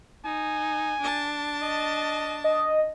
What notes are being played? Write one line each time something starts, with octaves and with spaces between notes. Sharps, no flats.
D#4 G#5
D4 A5
D#5
D#5